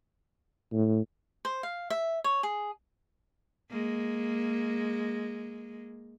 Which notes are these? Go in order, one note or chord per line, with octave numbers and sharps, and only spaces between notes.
A2
C5
F5
E5
C#5
G#4
G#3 A#3